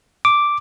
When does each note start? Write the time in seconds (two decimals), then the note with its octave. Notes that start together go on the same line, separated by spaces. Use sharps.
0.25 D6